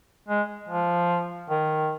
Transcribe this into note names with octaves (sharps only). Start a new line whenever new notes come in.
G#3
F3
D#3